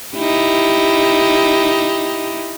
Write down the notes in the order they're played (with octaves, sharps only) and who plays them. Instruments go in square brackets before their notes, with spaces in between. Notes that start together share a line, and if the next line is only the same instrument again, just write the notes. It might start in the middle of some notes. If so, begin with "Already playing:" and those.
[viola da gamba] D#4 E4 G4